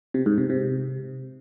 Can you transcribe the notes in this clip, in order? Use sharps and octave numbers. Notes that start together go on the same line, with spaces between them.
C3
G#2
C3
C3